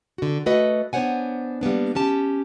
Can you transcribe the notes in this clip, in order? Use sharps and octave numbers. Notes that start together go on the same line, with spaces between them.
D3 F#4
A3 F#4 B4 D#5
B3 D4 C5 C#5 F#5 G#5
G3 A#3 B3 D4
C#4 G4 A5